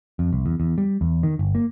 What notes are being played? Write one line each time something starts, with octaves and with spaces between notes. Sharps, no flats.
F2
C2
E2
E2
G3
E2
D#3
G1
A#3